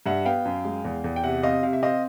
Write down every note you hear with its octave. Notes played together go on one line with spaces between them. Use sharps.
G2 E5 F#5
B3 F5 G5
F#2
G#3
E2
E2
G5
C3 E5 F#5
C4 D#5 F5
C3 F5
E5
C4 D#5 F5